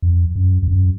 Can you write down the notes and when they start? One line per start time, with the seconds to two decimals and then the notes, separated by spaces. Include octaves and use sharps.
0.02 F2
0.36 F#2
0.63 F2
0.68 F#2